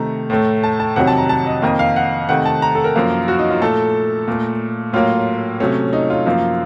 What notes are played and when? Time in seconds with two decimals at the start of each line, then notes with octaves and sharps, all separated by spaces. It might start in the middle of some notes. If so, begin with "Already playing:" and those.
Already playing: C3 D#3 A3 A#5
0.30 A2 A3
0.63 A5
0.80 A5
0.96 F2 C3 D#3 F#3 F#5
1.07 A5
1.18 A#5
1.29 A5
1.46 D#5
1.62 F2 D#3 A#3 D#5
1.79 F5
1.96 F#5
2.29 C3 D#3 A3 F#5
2.45 A5
2.62 A#5
2.75 A4
2.84 A#4
2.96 F#2 F3 A#3
3.28 F#4
3.39 D#4
3.51 F4
3.61 A#2 A3 A4
4.28 A#2 A3
4.93 A2 F#3 A#3 F4
5.60 C3 F#3 A3 C#4
5.93 D#4
6.10 F4
6.26 F#2 F3 A#3